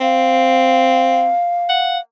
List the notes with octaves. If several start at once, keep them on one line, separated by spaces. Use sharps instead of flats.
C4 F5
F#5